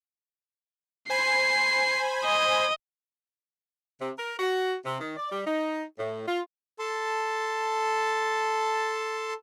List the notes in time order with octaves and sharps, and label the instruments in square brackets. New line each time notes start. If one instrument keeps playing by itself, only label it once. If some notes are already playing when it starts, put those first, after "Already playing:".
[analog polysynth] C5 G#5 B5 [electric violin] C7
[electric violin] D#5
[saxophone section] C3
A#4
F#4
C3
D#3
D5
G3
D#4
A2
F4
[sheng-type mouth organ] A4 A5 C6